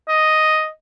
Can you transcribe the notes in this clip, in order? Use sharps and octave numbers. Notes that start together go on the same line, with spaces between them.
D#5